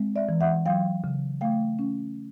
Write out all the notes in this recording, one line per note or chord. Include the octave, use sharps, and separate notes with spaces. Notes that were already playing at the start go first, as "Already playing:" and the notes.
Already playing: G#3 C4
D5 E5
E3
E5 F#5
F#3 F5 G5
C#3
A3 F5 G5
C#4